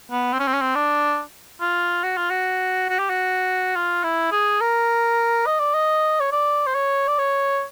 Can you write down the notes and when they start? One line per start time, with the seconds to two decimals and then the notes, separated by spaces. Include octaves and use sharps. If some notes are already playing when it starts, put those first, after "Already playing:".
0.12 B3
0.33 C4
0.40 C#4
0.47 C4
0.53 C#4
0.61 C4
0.75 D4
1.61 F4
2.04 F#4
2.17 F4
2.30 F#4
2.89 F#4
2.99 G4
3.10 F#4
3.76 F4
4.04 E4
4.32 G#4
4.61 A#4
5.46 D#5
5.60 D5
5.74 D#5
6.20 C#5
6.32 D5
6.66 C5
6.75 C#5
7.08 D5
7.18 C#5